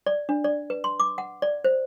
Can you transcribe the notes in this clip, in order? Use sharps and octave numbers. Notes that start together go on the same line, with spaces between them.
D5
D4
D5
B4
C6
D6
F#5
D5
C5